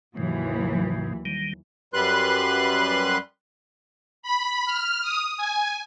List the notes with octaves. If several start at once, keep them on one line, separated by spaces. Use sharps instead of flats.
D#2 G#2 C3 E3 F#3
D#3 G3
F#2 G3 B4 C6 F#6
B5
F6
D#6
G#5